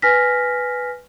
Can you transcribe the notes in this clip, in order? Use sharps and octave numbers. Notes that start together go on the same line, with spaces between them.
B4 G#5 F6 A#6 B6